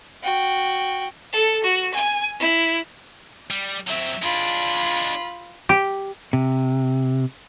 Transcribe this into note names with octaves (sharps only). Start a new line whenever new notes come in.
F#4 G5
A4
F#4
G#5
E4
G3
F#3 C4 E5
G#3 D4 F4 B5
G4
C3